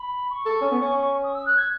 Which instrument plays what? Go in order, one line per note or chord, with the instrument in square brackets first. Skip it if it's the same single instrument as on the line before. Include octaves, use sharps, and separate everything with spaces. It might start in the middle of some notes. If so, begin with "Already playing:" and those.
Already playing: [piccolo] B5
C#6
[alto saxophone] A4
C#4
B3
C#4
[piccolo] D#6
E6
F#6
G#6